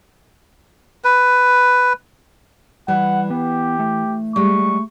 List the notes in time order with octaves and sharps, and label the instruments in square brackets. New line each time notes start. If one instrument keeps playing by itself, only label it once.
[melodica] B4
[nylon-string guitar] E3 [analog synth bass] G3 [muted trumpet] F#5
[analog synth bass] B3 [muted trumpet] G4
[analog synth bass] A3
[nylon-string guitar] G3 G#3 [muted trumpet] C#6